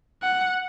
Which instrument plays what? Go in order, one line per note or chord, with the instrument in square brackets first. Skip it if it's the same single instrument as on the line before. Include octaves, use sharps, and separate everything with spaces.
[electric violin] F#5